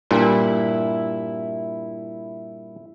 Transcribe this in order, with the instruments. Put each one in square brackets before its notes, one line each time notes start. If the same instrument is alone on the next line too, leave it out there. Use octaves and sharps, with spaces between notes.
[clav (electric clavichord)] G2 A#2 [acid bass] E4